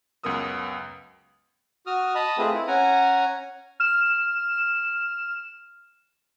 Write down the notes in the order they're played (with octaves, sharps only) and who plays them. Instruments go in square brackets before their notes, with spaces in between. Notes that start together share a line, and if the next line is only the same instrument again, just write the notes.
[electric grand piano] C#2 F#2 B3 A#4 D#6 E6
[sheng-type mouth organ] F#4 D#6 F6
D#5 A5 B5 D#6
A3 C4 F4 G#4 B4
E4
C#4 F#5 G#5 A#5
[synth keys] F6 E7